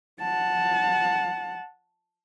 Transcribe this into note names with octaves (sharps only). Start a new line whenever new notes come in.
F#5 A5